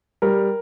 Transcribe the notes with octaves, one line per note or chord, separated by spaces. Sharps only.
G3 A#4